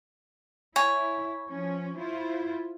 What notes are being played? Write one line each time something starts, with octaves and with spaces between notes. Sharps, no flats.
E4 C#5 G#5
F3 C#4
E4 F4 C5